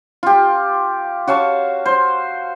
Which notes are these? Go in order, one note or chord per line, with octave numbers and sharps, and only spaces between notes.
F4 G4
F#4 C#5 F5 A5
C5